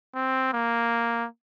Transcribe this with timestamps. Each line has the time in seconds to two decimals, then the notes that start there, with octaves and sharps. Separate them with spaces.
0.15 C4
0.53 A#3